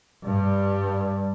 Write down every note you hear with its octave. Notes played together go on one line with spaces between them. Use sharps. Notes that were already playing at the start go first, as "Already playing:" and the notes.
G2 G3